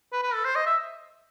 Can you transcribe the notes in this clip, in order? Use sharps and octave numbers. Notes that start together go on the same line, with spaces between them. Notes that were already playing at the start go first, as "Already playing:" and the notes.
B4
B4
A4
C5
D#5
E5